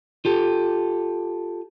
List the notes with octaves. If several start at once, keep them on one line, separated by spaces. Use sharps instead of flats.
F4 G4 A4